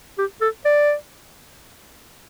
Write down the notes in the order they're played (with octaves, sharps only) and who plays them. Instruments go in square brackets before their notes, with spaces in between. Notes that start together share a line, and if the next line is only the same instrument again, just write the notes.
[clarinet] G4
A4
D5